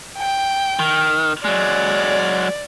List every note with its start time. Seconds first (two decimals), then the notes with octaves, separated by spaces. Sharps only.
0.18 G5
0.79 D#3
1.45 F#3 G#3 D5